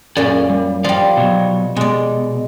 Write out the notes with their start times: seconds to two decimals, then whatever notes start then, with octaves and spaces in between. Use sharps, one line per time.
0.17 F#2 A#2 G#4 D5
0.50 G3
0.84 F3 G3 D5 F5
1.17 B2 F#3
1.77 B2 G#3 D5